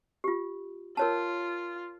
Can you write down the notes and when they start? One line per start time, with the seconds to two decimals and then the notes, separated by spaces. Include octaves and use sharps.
0.24 F4 G4
0.97 F4 A#4 C#5 A5